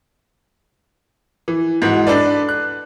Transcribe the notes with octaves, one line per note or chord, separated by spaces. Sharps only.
E3
G#2 E3 F#4
D4 A4 B4 D5
F#6